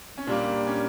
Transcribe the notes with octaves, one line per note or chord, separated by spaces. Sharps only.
C#4
A#2 G3 A#3 D4
C#4